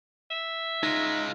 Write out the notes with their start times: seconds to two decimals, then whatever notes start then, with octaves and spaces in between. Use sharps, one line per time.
0.30 E5
0.83 G#3 D#4 F4 A#6